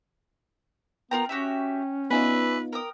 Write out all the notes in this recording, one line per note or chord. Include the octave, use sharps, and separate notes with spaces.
B3 F4 A#4 G5 A#5
C#4 F#4 G4 E5
B3 D#4 F4 B4 D5 E5 G#5
A#4 G5 D#6